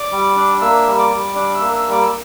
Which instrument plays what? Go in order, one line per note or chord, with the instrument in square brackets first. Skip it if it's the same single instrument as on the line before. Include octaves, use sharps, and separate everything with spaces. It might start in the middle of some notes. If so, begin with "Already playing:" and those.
Already playing: [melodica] D5 D6
G3
D4
A#3 E5 E6
G3
D5 D6
G3
D4 D5 D6
E5 E6
A#3
E5 E6
G3
D5 D6
E6